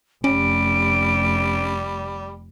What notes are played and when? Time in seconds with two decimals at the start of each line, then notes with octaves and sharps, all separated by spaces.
0.24 F1 G3 C#4 D7